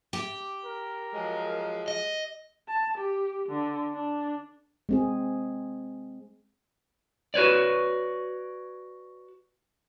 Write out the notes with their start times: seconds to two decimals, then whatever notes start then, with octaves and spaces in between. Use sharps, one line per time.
0.13 G4
0.65 A#4
1.14 F3 F#3 G#3
1.88 D#5
2.68 A5
2.98 G4
3.50 D3
3.93 D4
4.89 G#3 C4 G#4
7.34 F#4 B4 C#5 D5